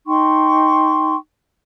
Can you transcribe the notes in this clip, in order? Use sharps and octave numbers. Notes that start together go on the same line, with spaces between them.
D#4 G5 C6 C#6